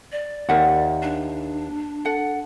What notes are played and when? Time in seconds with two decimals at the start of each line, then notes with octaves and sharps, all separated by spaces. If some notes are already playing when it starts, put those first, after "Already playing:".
0.12 D5
0.49 D#2 A#4 E5 F#5
1.02 D4
2.05 A4 F#5